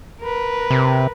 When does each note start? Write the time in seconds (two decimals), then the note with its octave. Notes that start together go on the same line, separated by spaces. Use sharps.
0.22 A#4 B4
0.70 C3